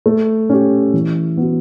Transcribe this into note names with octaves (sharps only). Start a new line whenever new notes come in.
A3
C#4 G4
E3
B3 F#4